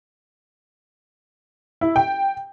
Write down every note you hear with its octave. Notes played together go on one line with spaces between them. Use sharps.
E4
G5